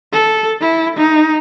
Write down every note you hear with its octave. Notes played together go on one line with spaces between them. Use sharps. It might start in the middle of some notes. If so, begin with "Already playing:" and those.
A4
E4
D#4